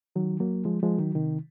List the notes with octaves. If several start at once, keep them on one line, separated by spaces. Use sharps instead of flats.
D#3 F#3
F#3 A#3
F3 G#3
F3 G#3
D#3 F#3
C3 D#3